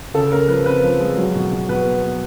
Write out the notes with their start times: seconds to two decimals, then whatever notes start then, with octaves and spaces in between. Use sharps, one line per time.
0.14 C#3 A4
0.32 C#3 A#4
0.48 F3 B4
0.66 C4 B4
0.84 F3
1.00 G#3
1.17 F#3
1.35 B2
1.52 B2
1.69 B2 B4
1.86 B3
2.04 B3